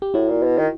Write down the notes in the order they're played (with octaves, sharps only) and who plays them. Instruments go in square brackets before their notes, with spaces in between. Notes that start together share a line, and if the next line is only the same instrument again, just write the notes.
[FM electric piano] G4
[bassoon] A2 [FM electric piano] E4 F#4
[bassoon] A#2
B2
D#3